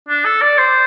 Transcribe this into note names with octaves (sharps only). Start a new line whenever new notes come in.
D4
A4
D5
C5